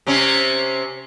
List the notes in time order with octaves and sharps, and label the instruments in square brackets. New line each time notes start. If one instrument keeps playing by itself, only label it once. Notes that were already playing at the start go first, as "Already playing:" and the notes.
[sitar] C3 C4 C#4